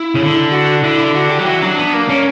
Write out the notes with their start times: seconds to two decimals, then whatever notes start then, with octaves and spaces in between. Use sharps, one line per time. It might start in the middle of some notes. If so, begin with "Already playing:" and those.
Already playing: E4
0.15 C#3
0.20 D3
0.51 F#4
0.84 D3 E4
0.99 E4
1.14 F#4
1.30 G4
1.39 F#3
1.46 E3 F#4
1.62 F#3 D4
1.78 B3
1.93 A#3
2.09 A#3 C#4